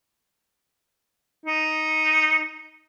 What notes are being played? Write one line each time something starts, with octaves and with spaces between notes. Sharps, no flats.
D#4